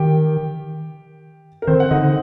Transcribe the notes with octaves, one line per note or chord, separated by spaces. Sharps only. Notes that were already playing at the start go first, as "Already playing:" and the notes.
Already playing: D#3 G4 G5
A#4
D#3 C4 C5
F#5
D3 D#4 D#5